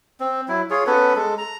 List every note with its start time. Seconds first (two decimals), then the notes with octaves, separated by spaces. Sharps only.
0.20 C4
0.48 F#3 E4
0.70 F4 G#4 C#5
0.87 B3 C#4 A4 B4
1.15 G#3 A4
1.38 A#5